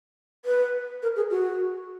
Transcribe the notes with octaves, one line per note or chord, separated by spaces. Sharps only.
B4
A#4
G#4
F#4